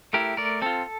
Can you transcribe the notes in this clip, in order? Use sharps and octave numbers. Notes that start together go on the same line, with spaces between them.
A3 E4 G4 A#4
A3 A#4 D5
C4 F4 A4